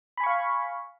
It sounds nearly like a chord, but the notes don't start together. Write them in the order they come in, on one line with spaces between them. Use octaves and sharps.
B5 G#5 C#6 F5